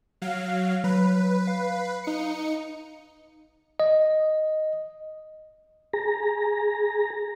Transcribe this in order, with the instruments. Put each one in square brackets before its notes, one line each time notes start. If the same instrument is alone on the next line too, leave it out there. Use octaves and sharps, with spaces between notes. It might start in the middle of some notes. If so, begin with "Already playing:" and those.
[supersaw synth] F#3 F5
[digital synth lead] F#3 [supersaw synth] B4
[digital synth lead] F5
[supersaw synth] D#4 C#7
[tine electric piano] D#5
[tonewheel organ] G#4 A#5